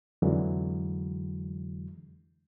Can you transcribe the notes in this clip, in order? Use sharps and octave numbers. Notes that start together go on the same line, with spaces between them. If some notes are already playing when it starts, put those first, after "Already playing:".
F2 D3 E3 F#3 G#3